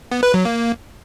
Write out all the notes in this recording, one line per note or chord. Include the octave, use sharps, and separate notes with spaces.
B3
B4
F#3
A#3